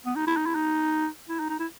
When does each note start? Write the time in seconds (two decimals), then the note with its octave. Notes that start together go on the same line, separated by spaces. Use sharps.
0.06 B3
0.16 D#4
0.27 E4
0.36 D#4
0.46 E4
0.55 D#4
1.29 E4
1.39 D#4
1.50 D#4
1.60 E4